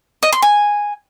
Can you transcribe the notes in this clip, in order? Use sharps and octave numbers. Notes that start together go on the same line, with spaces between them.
D#5
C6
G#5